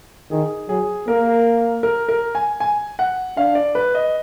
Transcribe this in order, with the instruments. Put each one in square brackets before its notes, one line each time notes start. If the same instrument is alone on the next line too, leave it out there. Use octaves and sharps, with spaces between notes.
[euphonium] D#3 [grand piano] G#4
[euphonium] F#3 [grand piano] G#4
[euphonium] A#3 [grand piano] A#4
[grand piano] A#4
A#4
G#5
G#5
F#5
[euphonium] D4 [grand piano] F5
[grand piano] D5
B4
D#5